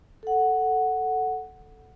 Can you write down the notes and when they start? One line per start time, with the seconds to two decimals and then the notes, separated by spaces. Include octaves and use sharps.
0.23 A4 F#5